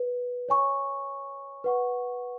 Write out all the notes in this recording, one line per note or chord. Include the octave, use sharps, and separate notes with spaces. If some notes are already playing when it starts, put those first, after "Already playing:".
Already playing: B4
C#5 G#5 C#6
B4 F#5 C#6